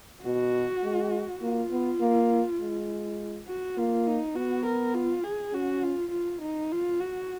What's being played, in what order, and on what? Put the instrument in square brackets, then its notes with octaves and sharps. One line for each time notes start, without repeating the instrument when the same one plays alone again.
[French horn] B2 [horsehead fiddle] F#4
[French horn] G#3
[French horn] A#3 [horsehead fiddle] F4
[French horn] B3
A#3
G#3
[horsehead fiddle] F#4
[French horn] A#3 [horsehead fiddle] F4
[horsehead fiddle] D#4
[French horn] B3 [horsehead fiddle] F#4
[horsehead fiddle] A#4
F4
G#4
[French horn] C#4 [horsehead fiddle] F#4
[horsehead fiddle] F4
F4
D#4
F4
F#4